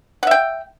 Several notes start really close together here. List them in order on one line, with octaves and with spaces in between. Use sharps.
F#5 E5 G5